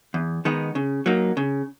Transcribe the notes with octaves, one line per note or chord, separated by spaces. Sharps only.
E2
D#3 G#3 B3 D#4
C#3
F#3 A#3 D#4
C#3